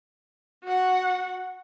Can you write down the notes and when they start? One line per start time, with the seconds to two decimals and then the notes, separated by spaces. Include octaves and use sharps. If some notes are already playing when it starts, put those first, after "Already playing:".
0.64 F#4 F#5